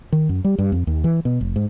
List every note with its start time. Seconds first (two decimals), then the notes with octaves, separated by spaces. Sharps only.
0.12 D#3
0.29 F#2
0.44 G3
0.58 G2
0.72 F2
0.87 D#2
1.04 E3
1.25 B2
1.41 F1
1.56 G#2